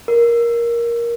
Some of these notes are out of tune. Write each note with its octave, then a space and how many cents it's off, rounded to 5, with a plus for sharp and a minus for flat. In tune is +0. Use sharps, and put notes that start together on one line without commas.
A#4 +10